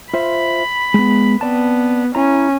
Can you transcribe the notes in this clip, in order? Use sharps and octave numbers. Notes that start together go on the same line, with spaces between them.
F4 C5 E5 B5
G#3 B3
B3 C4 D5 A5
C#4 E4 A#5